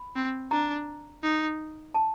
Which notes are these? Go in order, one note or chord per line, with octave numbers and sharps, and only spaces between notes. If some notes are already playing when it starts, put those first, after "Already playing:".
Already playing: B5
C4
D4 A#5
D#4
A5